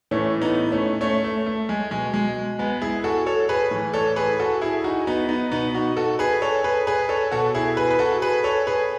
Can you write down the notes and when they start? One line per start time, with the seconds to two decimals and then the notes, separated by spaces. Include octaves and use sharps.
0.11 A2 E3 A3 C#4
0.41 B3 D#4
0.72 A3 C#4
1.01 A3 C#4
1.24 A3
1.47 A3
1.69 G#3
1.91 B2 G#3
2.14 G#3
2.59 G#3 B3
2.81 E4 G#4
3.04 F#4 A4
3.26 A4 C#5
3.49 G#4 B4
3.71 A2 E3
3.94 A4 C#5
4.16 G#4 B4
4.39 F#4 A4
4.61 E4 G#4
4.84 D#4 F#4
5.07 B3 D#4
5.29 B3 D#4
5.52 B2 B3 D#4
5.74 D#4 F#4
5.97 F#4 A4
6.19 G#4 B4
6.42 A4 C#5
6.64 G#4 B4
6.87 G#4 B4
7.09 A4 C#5
7.31 B2 F#4 A4
7.55 E4 G#4
7.77 G#4 B4
7.91 B4
7.99 F#4 A4
8.22 G#4 B4
8.44 A4 C#5
8.67 G#4 B4